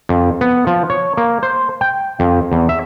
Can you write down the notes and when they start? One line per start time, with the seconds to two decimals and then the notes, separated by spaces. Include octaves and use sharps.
0.09 F2
0.41 B3
0.67 F3
0.90 C#5
1.17 A#3
1.43 C5
1.81 G5
2.20 F2
2.52 E2
2.69 E5